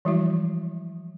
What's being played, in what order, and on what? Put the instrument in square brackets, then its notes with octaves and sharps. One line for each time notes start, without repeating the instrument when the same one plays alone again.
[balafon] E3 F3 G3 G#3 E4 F#4